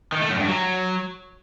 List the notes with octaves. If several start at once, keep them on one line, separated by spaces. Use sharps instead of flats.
D#3
A3
F#2
G2
F#3